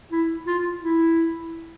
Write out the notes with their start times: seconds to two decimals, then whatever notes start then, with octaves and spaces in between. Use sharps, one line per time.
0.12 E4
0.47 F4
0.82 E4